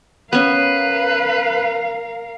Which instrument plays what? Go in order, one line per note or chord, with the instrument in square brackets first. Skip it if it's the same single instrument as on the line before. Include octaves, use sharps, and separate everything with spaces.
[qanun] B3 C#4 [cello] A#4 F5 [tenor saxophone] B4